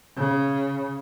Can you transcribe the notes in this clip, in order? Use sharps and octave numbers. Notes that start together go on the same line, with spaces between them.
C#3